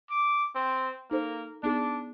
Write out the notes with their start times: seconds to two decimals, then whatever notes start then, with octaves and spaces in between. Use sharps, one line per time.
0.10 D6
0.55 C4
1.11 A#3 D#4 A4 C5
1.63 B3 D4 D#4 G#4